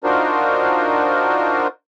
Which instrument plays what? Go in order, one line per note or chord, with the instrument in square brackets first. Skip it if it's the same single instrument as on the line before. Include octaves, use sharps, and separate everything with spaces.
[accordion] D4 D#4 F4 F#4 A#4 C5